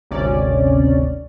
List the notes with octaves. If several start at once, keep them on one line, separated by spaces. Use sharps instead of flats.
G#1 D2 C3 C#4 D5